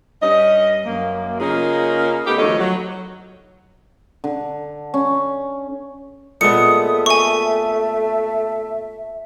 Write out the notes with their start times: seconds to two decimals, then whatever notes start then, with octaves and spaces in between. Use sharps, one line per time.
0.23 G2 G3 C#4 D#5
0.85 F#2 A#3
1.40 C#3 A#3 C#4 D#4 F4 G#4
2.26 A3 B3 D#4 G4
2.38 D2 D#3 F3 A3 C#5 D#5
2.59 F#3
4.24 D3
4.94 C#4
6.41 A#2 G#3 A3 B3 D#6 C#7
7.06 E5 G#5 C#6